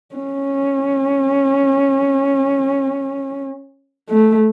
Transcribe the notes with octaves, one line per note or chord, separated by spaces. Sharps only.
C#4
A3